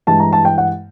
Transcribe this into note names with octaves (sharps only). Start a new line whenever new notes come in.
G2 E3 G#3 A5
A#5
A5
G5
F#5